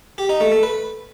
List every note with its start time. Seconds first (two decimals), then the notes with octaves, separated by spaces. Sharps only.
0.18 G4
0.29 D#4
0.41 A3
0.52 A3
0.63 B4